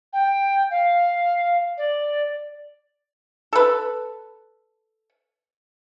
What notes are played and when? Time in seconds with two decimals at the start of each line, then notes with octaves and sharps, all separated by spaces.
0.13 G5
0.70 F5
1.77 D5
3.53 A4 B4